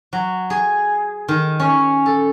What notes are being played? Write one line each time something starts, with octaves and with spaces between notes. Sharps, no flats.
F#3
G#4
D#3
C#4
A4